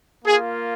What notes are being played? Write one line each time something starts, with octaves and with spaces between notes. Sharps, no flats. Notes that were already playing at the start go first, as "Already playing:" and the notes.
A#3 F4 G#4